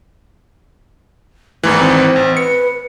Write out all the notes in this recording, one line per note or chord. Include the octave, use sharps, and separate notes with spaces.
G#1 G#2 E3 A3
C4
A1
B4 C#7